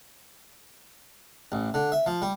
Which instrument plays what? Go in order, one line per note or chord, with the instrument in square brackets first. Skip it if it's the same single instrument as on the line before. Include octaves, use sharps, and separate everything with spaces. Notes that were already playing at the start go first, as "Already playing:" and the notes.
[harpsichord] A1
D3
E5
F3
G3